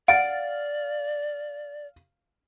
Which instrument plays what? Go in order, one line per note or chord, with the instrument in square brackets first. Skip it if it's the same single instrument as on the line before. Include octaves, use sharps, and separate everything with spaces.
[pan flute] D5 [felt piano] F5 A6 [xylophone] F#5 D7